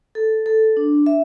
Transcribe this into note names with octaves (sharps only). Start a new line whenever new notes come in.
A4
A4
D4
E5